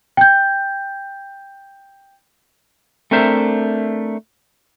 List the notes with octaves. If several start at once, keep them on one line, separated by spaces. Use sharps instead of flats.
G5 G6
A3 C4 D4 A#4 C5 E5